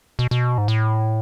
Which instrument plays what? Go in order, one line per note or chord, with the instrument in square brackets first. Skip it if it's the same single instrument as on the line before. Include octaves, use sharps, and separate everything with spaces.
[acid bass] B2
B2
G#2
A2